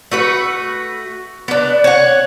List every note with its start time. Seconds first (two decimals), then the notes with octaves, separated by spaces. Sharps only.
0.12 A3 F#4 B4
1.48 B3 D4
1.84 C#5 F#5